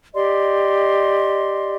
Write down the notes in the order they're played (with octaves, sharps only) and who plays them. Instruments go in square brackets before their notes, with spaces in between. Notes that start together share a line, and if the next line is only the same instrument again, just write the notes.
[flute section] G4 D5 D#5 C6